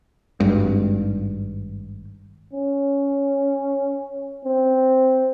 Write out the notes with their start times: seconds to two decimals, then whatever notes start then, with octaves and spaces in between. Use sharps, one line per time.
0.40 G#1 G2
2.53 C#4
4.45 C4